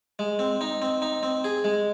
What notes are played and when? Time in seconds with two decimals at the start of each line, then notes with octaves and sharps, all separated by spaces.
0.19 G#3
0.39 C4
0.61 D#4
0.82 C4
1.02 D#4
1.23 C4
1.44 G#4
1.64 G#3